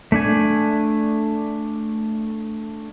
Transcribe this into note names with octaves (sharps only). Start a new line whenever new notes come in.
A3 D4 G#5